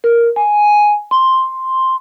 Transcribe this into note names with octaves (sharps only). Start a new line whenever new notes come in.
A#4
G#5
C6